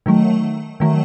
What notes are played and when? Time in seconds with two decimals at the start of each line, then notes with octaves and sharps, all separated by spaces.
0.06 D#3 F#3 A3
0.80 D#3 F#3 A3